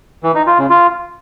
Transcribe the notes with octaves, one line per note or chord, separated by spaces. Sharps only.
E3
D#4
F4
C#3
F4